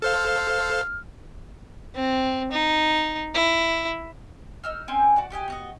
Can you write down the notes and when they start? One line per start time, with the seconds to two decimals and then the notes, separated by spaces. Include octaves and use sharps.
0.02 A4 C5 F5 F6
1.95 C4
2.52 D#4
3.34 E4
4.64 D#4 E6 F6
4.88 C4 C#4 G5 G#5
5.16 F#4 D5 F#5
5.30 F#4 G4 D#5 G#5
5.48 B3 F#4 D#5